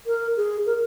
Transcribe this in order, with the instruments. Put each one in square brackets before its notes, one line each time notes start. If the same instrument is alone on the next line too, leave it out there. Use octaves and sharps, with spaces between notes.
[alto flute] A#4
G#4
A#4